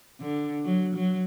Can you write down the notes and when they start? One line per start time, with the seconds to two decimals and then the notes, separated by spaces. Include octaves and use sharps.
0.21 D3
0.65 F#3
0.95 F#3